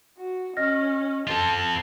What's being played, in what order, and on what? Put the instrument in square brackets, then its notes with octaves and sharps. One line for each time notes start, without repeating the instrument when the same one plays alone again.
[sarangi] F#4
[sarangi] C#4 [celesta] D#5 F6 A#6
[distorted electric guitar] C4 F4 [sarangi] A4